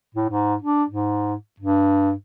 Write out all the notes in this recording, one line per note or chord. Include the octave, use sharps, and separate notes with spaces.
A2
G#2
D4
G#2
G2